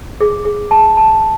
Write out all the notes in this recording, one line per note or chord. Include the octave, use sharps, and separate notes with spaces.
G#4
G#4
A5
A5